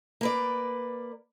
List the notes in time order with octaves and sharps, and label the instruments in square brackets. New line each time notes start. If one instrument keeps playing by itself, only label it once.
[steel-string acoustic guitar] A#3 B4 D5